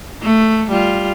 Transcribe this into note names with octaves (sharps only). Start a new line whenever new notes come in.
A3
G3 F4